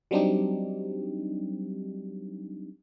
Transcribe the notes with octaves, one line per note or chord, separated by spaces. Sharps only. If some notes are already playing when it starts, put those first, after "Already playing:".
F#3 G3 C4 D4 D#4 G4